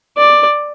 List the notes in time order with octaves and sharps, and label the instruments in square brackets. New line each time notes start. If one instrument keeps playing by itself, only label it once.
[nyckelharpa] D5